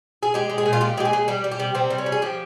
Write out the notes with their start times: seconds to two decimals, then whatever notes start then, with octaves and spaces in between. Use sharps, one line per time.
0.23 G#4
0.34 G#3 G4
0.50 G#3
0.58 G#4
0.66 A#2
0.73 F4
0.81 A#2 G4
0.97 G#3 G4
1.05 G#4
1.13 G#3
1.28 G3 G4
1.44 G3
1.52 G4
1.60 C3
1.75 C3 C4
1.90 G3
1.98 C#4
2.06 G3
2.12 G#4
2.22 F3 G4